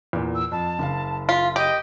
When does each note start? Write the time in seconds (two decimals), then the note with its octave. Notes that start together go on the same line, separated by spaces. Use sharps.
0.13 E2 A#2
0.35 E6
0.52 F2 A5
0.79 F#1 F5
1.29 F4 B6
1.56 G4 D#5